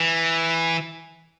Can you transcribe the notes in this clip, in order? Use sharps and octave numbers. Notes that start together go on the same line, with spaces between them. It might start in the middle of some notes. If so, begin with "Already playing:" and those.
Already playing: E3